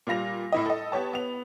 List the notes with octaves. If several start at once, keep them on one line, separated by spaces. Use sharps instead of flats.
A#2 G3 F5 A#6 F7
A2 E4 D#5
A4 D#5
B3 G4 C#5 A5
B3 F7